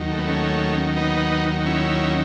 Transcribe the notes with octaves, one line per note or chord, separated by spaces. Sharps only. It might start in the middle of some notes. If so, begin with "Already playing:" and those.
Already playing: D#2 D#3 F#3
A3
B3
A3 C#4
B3 D#4
C#4 E4